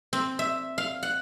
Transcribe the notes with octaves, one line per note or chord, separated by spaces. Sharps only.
C4
E5
F5
F#5